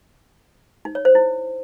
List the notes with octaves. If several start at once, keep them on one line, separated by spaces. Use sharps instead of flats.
D#4
C#5
C5
E4